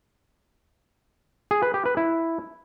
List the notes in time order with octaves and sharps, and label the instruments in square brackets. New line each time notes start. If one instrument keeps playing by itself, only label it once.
[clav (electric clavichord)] G#4
B4
G4
B4
E4